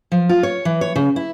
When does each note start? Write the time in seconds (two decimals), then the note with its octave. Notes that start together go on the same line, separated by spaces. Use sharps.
0.12 F3
0.29 F4
0.43 C#5
0.65 E3
0.81 C#5
0.96 C#3
1.16 E4